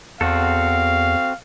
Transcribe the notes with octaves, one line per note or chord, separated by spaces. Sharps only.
E2 C4 F#4 A4 F5